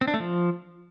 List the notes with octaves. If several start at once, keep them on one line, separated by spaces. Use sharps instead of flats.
C4
D4
A3
F3